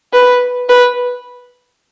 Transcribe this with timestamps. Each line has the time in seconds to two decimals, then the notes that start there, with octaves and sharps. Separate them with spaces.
0.13 B4
0.69 B4